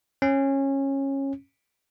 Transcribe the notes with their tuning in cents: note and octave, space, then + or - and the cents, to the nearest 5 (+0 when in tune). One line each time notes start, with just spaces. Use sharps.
C#4 -20